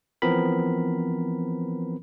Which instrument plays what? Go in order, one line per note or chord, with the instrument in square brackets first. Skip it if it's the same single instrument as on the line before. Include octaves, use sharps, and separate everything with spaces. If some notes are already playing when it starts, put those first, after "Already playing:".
[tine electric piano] E3 F3 B3 C4 A#4 B5